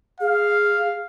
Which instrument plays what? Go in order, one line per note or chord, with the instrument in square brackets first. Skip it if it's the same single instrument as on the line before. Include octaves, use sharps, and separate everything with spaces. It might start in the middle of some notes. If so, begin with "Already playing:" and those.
[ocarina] G#4 [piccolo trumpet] F5